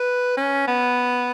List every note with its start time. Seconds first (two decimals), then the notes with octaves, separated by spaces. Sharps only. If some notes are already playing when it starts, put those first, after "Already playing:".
Already playing: B4
0.37 C#4
0.67 B3